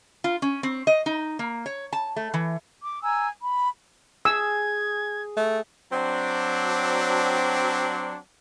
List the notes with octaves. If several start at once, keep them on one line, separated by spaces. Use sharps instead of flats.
F4
C#4
C4
D#5
D#4
A#3
C#5
A5
A3
E3
D6
G#5 A#5 E6
B5
G#4 E6 G#6
A3
F#3 C4 D4